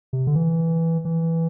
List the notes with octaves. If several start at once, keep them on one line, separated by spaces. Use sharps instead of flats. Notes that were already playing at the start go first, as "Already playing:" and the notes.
C3
D3
E3
E3